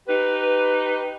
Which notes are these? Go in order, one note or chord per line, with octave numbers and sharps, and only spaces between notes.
D#4 G4 B4